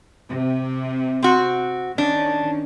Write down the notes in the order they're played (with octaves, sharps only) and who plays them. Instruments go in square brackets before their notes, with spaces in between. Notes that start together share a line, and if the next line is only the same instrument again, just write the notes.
[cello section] C3
[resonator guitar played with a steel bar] C4 F#4
[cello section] D#3 C#4 [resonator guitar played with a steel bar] D4